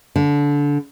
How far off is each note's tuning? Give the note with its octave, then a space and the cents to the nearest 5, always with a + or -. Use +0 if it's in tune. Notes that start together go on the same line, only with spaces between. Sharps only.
D3 -20